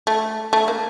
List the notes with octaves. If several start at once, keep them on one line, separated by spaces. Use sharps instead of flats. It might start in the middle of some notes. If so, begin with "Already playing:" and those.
A3
A3
A#3